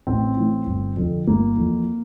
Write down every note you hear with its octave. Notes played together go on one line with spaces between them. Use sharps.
A1 C4
A2 E3
G1
F2 D3
G1 A#3
F2 E3